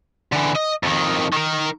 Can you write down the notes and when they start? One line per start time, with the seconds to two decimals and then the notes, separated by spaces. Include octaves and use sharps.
0.33 D3 E3
0.56 D#5
0.83 F2 D#3
1.33 D#3 A#4